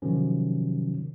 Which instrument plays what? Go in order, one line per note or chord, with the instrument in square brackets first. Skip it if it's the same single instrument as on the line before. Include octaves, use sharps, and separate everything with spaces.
[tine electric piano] C3 D#3 F3 F#3 C#4